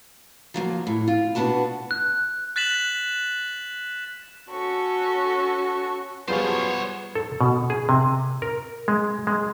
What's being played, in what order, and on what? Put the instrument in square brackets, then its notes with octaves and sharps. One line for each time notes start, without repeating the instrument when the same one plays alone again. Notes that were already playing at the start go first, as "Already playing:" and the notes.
[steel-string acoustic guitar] F3 F#3 A#3
A2
F4
B2 B3 D4 F#4 A5
[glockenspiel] F#6
[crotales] F#6 A6 B6 E7 F#7
[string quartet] C#4 F#4 A4 C#6
[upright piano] F#3 G3 G#4 [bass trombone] B3 [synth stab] F4 A5 [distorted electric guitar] C5 C#5
[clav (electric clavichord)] A4
B2
G#4
C3
A#4
G#3
G#3